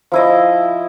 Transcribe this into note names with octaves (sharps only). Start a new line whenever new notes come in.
F3 E4 D#5